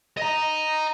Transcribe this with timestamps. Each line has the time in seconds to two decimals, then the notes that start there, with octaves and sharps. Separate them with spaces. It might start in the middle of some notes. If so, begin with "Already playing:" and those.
0.17 D#5 A#5